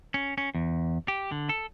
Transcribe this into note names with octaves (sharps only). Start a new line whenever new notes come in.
C#4
C#4
E2
G4
D3
A4